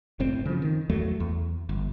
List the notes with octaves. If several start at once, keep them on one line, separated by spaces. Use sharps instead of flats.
F#1 A2 C4
C#3 F3
D#3
E2 F#3 A3
E2
G1